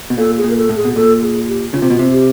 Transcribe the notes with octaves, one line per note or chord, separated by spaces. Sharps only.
B2
A#2 A4
G#4
A#2
A#4
A4
A2
G#4
B2
A#2 A4
G#4
G4
C#3 F4
C3
B2
C3
G4